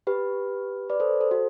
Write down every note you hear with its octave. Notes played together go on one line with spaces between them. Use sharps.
G4 B4
B4 D5
A4 C5
A4 C5
F#4 A4